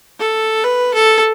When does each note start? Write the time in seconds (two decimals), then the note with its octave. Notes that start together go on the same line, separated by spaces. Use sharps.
0.20 A4
0.64 B4
0.94 A4